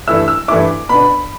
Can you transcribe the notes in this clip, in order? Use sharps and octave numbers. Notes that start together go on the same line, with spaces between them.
G2 E3 A3 E4 E6
E6
G2 E3 A3 E4 D6
B2 B3 D4 B5